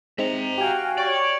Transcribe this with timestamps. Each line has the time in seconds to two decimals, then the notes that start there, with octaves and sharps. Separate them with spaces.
0.18 G#3 C4 D#4 E5 A#5
0.58 F#4 G4 F5 G5 G#5
0.98 C#5 D5